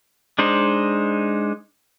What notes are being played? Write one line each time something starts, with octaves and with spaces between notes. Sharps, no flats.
G#3 D4 D#4 C5